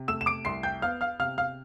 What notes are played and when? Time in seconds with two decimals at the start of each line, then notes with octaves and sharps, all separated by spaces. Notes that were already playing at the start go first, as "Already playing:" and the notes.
Already playing: C3
0.08 A3 E6 E7
0.21 E7
0.26 D6 D7
0.45 C2 C6 C7
0.63 G5 G6
0.82 B3 F5 F6
1.01 F5 F6
1.20 C3 F5 F6
1.38 F5 F6